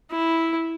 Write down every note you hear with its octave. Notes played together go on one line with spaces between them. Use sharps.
E4